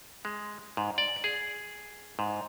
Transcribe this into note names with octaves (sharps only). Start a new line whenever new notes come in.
G#3
G#2
D5
G#4
G#2